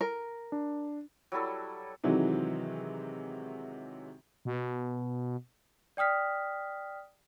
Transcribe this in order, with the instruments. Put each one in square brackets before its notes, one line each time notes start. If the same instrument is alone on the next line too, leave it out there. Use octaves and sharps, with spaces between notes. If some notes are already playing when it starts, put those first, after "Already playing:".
[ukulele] A#4
[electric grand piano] D4
[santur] F#3 G3 E4 A4
[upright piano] C3 D#3 E3 F#3 G#3
[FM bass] B2
[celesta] D5 G5 D#6 F6 B6